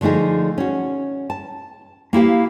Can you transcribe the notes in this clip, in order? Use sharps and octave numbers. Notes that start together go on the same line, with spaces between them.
D3 F3 A3 D#4 G#4
C#4 F#4
A5
A#3 E4 G4 F5